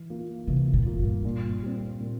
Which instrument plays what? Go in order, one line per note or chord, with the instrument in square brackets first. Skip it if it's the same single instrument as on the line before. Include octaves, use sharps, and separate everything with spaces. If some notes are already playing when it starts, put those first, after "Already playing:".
Already playing: [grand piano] E3
A#3 F4
[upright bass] C3 [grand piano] E3
[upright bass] A#2
[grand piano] A#3 F4
[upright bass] G2
[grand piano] A#2
G3 C4
A#2